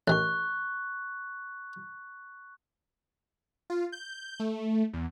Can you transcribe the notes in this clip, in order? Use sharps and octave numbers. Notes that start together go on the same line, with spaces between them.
A1 D#3 C#6 F#6
F4
G6
A3
E2